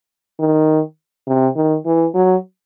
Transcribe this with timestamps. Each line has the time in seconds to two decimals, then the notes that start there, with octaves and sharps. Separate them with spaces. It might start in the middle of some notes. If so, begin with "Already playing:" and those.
0.39 D#3
1.27 C3
1.56 D#3
1.85 E3
2.15 F#3